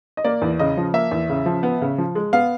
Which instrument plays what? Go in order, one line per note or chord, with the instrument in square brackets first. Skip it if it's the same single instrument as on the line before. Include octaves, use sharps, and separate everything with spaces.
[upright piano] D#5
A#3 D5
E2
C#3 D#5
F3
A#3 E5
E2
C#3
F3
B3
C#3
F3
G#3
B3 F5